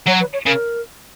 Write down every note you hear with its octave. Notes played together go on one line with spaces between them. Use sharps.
F#3 C#5
B4
C#5
C#3 A#4